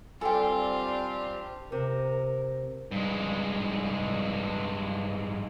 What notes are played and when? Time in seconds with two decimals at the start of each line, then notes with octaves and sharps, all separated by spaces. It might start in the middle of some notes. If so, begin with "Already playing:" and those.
0.21 G3 C4 D4 F4 G4 A4 G5 G#5
1.72 C3 A#4
2.91 G2 G#3